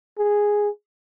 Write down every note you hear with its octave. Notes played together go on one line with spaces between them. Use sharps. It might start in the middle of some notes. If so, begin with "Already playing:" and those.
G#4